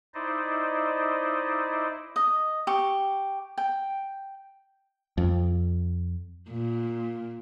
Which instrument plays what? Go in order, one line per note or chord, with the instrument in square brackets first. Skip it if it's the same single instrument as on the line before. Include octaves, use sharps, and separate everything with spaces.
[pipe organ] D#4 E4 C5 D5 D#5
[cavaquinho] D#5
G4 C#6
G5
[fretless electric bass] F2
[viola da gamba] A#2